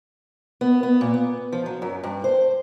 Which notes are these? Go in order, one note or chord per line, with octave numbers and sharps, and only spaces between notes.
B3
B3
A#2
B3
F3
F#3
F#2
G2
C5